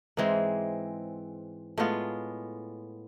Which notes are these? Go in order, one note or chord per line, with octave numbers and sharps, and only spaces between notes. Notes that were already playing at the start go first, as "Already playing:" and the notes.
G#2 E3 G#3 C4
A2 G#3 B3 F4